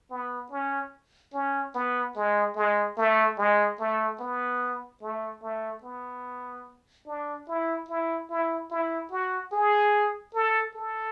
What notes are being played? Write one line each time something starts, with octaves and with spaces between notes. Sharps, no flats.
B3
C#4
C#4
B3
G#3
G#3
A3
G#3
A3
B3
A3
A3
B3
D4
E4
E4
E4
E4
F#4
G#4
A4
A4